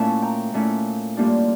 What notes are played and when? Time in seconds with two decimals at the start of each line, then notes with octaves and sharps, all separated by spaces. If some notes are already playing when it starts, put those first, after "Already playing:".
Already playing: A#2 A3 C#4 E4 A5 C#6
0.22 G5 A#5
0.54 A#2 A3 C#4 E4
1.17 A2 G3 A#3 D4 F4